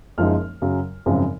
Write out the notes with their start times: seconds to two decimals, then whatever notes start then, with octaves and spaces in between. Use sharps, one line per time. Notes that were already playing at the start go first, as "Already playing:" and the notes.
0.18 F#1 F#2 F3 G#3 D#4 F6
0.62 F#2 C#3 F#3
1.06 G#1 F#2 C#3 F3 C4